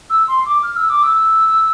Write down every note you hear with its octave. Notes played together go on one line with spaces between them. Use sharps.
E6
C6
D6
F6
E6
D6
E6